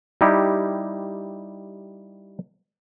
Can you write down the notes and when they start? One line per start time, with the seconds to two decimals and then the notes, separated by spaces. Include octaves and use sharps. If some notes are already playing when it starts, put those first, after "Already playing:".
0.21 G3 D#4 E4 G4